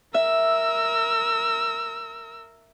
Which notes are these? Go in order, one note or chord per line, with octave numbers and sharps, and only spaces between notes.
A#4 E5 E6